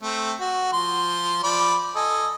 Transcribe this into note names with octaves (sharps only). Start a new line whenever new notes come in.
A3 C4
F#4
F3 C6
F3 D5 B5
A4 D#5 G#5